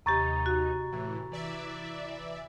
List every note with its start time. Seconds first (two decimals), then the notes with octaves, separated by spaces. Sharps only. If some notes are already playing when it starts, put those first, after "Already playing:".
0.06 D#2 C3 D#4 G4 A#5 C#6 A6
0.46 F#4
0.92 A2 E3
1.32 E3 D5 E5